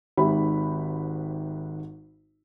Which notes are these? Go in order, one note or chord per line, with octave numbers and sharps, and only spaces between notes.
G#1 G#2 G4 E5 B5